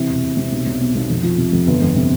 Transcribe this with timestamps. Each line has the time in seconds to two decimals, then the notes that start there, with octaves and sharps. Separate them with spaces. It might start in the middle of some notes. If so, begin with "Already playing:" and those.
Already playing: C3 E3
0.09 E1
0.23 E1
0.37 C3
0.52 B1
0.66 B1
0.80 B2
0.95 B1
1.09 F2
1.23 F3
1.38 C3
1.53 F2
1.67 G1
1.82 F2
1.95 C3